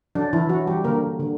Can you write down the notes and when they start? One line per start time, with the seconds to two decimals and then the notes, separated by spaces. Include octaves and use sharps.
0.15 F#3 D4
0.33 E3 E4
0.49 F#3 F#4
0.67 G3 G4
0.84 D3 A#3 A#4
1.20 D3